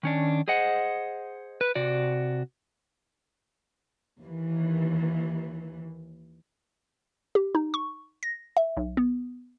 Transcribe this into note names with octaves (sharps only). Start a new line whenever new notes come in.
D#3 C#4 D4
G#4 C5 D#5 F#5
B4
C3 F#4 D5
D#2 E3
G4
D#4
C#6
A#6
E5
B1
B3